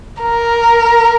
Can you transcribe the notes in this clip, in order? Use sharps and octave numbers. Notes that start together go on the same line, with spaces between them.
A#4